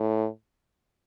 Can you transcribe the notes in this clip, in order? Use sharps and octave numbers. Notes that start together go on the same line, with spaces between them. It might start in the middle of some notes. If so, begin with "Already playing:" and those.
Already playing: A2